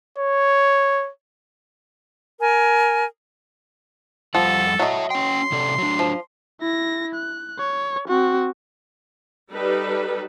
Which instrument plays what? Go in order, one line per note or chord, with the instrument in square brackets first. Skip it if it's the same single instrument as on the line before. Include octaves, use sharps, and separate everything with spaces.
[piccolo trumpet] C#5
[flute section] A#4 G#5
[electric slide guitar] F2 G3 F#5 [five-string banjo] F3 [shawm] A4
[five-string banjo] F#3 D#5 [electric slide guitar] C#5 E5 A5
[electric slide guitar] C#4 G5 [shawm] C6
[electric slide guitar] C3 A4 D5
F#3 D4
[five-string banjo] F3
[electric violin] E4 A#6
F#6
C#5
C4 F#4
[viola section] G3 D#4 A4 B4